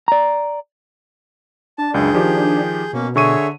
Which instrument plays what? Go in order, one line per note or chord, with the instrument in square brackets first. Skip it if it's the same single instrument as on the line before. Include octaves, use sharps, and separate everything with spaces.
[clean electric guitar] D5 A#5
[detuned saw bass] D4 [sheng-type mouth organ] A5
[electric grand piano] C#2 F#2 [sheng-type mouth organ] G#4 G6
[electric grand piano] D#3 F3 G4
[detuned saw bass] B2 [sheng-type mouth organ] A#3 C#4
[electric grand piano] D3 C#6 D#7 [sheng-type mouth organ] G#4 C#5 E5